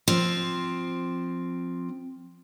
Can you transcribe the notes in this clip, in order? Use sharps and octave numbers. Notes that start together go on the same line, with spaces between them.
F3 C4